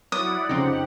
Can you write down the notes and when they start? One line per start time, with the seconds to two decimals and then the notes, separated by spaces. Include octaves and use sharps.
0.12 F#3 E4 D5 F#5 D#6
0.49 F2 C#3 C4 D#4 G4 F#5